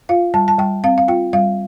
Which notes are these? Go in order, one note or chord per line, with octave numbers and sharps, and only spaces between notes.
F4 F5
G3 A5
A5
G3 G5
C4 F5
F5
F4 G5
G3 F5